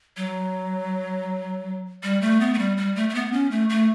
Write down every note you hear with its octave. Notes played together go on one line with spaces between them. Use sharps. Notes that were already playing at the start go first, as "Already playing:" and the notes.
F#3
G3
A3
B3
A3
G3
G3
A3
A3
B3
C#4
A3
A3